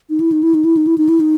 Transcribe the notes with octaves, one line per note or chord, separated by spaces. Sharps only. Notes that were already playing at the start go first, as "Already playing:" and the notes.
D#4
E4
D#4
E4
D#4
E4
D#4
E4
D#4
E4
D#4